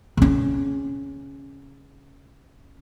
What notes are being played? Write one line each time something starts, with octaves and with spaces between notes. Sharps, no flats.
C#3 C#4